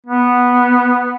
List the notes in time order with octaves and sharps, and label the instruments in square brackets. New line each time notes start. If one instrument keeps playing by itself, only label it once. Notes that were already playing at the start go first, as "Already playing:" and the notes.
[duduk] B3